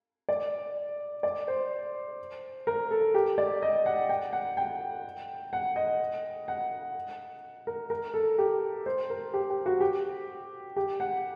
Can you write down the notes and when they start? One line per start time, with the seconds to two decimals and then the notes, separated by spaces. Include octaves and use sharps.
0.29 D5
1.23 D5
1.48 C5
2.67 A#4
2.91 A4
3.14 G4
3.38 D5
3.62 D#5
3.86 F#5
4.09 G5
4.33 F#5
4.57 G5
5.53 F#5
5.76 D#5
6.48 F#5
7.67 A#4
7.90 A#4
8.14 A4
8.38 G4
8.86 C5
9.10 A#4
9.34 G4
9.50 G4
9.66 F#4
9.80 G4
10.76 G4
11.00 F#5